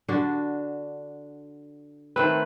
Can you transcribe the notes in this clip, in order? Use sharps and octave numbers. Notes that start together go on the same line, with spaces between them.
D3 D4 F#4
D#3 A3 C4 B4